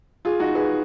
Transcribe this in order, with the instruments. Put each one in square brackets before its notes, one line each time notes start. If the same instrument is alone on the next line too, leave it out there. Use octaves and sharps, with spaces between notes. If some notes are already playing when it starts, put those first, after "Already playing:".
[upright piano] F4 G#4
D#4 F#4
G#4 B4